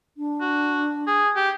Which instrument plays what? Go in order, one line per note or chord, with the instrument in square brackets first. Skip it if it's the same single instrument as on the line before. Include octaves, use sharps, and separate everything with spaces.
[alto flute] D4
[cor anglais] F#4
G#4
G4